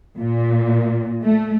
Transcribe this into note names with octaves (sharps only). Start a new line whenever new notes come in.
A#2
A3